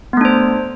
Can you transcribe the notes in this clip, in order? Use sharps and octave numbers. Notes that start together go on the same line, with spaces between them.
A3 B3 D4 C5